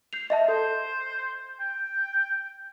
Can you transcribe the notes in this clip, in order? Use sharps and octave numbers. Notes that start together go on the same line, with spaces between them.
G6 C7 F7
D#5 E5 A5
A4 C5
G5